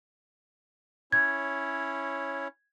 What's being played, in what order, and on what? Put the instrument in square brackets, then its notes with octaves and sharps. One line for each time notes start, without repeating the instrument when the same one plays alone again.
[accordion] C#4 E4 C#5 [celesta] G#6